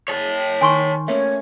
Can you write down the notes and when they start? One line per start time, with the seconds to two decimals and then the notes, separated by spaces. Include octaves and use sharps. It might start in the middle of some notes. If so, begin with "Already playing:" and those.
0.08 C#5 A5
0.61 D#3 G#5 C6 C#6
1.08 A3 A#3 C#4 C#5 E5